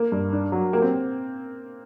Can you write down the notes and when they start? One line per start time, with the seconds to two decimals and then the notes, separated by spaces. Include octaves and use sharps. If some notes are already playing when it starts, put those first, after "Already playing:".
Already playing: A#3
0.12 G2
0.33 D4
0.52 F#3
0.73 A#3 G4
0.82 C4